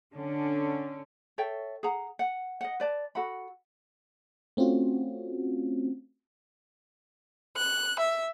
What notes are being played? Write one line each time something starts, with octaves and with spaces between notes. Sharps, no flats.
D3 C#4
A4 C#5 E5 G5
G#4 F#5 A#5
F#5
D#5 F#5
B4 D5 A5
F#4 A4 F#5 B5
A3 C4 C#4 F4 F#4
F#6
E5